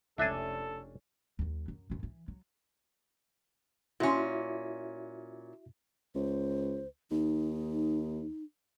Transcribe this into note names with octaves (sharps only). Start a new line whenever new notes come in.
F1 C#2 C#4 D4 A4 E5 G#5
D#2 F#3
F#2
F#2 A2
E3
F#3
A#2 C#4 E4 F#4 E5
C#2 C5
D#2 D#4